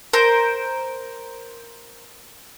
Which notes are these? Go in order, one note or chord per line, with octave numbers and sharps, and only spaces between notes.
A#4 C5